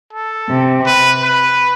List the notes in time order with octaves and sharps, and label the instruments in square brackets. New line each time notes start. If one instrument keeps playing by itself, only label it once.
[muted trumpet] A4
[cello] C3
[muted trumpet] B4
B4